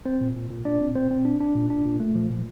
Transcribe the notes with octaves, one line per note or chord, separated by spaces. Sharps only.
C4 C5
A#2
A#2
A#2
A#2 D4 D5
C4
A#2 C4 C5
C4
D4
D4
A#2
D4
A#2
A3
F3
A#2